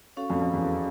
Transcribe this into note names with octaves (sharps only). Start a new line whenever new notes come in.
C#4 F#4 A4 C#5 F5
F2
F2
E2